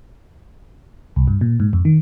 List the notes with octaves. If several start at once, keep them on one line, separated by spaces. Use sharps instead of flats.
C2
G2
A#2
G#2
F2
D#3